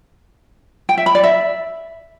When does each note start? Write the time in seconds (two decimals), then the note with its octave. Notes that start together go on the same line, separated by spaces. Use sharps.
0.89 G5
0.98 E5
1.06 B5
1.15 D5
1.24 E5